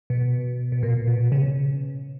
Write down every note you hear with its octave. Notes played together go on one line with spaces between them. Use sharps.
B2
B2
A#2
B2
C#3